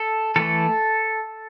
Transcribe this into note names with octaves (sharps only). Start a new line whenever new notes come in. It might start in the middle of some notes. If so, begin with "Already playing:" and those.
Already playing: A4
E3 A3 A4